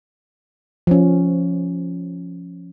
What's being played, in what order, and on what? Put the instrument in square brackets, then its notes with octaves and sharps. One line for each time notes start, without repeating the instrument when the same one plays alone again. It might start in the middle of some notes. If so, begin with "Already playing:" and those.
[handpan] F3 C#4